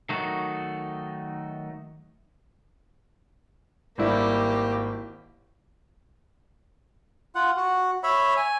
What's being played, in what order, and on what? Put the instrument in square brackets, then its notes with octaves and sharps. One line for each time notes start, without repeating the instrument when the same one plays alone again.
[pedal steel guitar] D#3 F#3 A3 D#4 F#4
[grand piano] G#1 G3 E4 [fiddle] A#3 G4
[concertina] F4 F#5
F#4
C#5 E5 B5
G#5